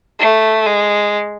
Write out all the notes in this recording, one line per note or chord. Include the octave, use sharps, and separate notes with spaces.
A3
G#3